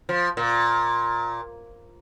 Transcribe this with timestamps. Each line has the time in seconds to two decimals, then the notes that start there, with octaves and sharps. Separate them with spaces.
0.09 F3
0.37 A#2